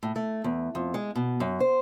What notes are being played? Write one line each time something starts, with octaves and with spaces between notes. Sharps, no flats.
A2
A3
E2
F2
G#3
B2
F#2
C5